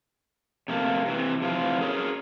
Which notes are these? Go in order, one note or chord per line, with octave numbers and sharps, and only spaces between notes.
C3 A3 A#3
C3 E3
C3 E3 F3 F4
G#4 A#4 C#5